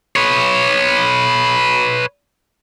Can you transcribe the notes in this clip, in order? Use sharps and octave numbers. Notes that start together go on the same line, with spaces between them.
B4 C#5